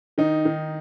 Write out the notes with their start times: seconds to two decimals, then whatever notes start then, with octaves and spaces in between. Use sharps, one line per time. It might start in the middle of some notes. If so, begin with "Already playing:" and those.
0.18 D#3 D#4
0.45 D#3